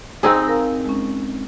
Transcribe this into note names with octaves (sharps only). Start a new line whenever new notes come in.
C4 D#4 G#4 C5 A#5 E6
A#4 F5 A#5
G#3 C#4